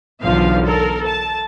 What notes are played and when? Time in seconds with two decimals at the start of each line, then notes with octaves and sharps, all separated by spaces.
0.22 B1 E2 D3 F3 F5
0.64 A4 A#4
1.06 A5